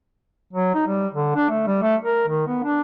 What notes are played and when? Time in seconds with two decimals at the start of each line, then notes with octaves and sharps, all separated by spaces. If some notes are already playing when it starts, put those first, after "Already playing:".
0.53 F#3
0.75 D#4
0.86 G3
1.13 D3
1.36 D4
1.50 A3
1.67 G3
1.82 A3
2.05 A#4
2.28 D#3
2.47 B3
2.64 D4